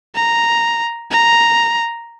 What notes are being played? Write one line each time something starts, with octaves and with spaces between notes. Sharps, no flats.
A#5
A#5